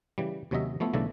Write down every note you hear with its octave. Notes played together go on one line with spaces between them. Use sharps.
C#3 E3 G3
D#2 C3 F#3 C#4 D#5 E5
F3 A3 B3 E4
B1 C#3 E3 A3 D4 A4